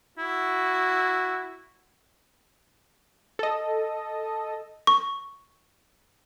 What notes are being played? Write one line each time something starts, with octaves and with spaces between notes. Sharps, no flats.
E4 F#4
A4 D#5
C#6